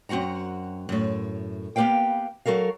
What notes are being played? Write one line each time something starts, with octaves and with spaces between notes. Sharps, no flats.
F#2 C4 F#4 F#5 A#5
F#2 A2
A#3 B3 G4 B4 F5 G5
F#3 F#4 A4 A#4 F5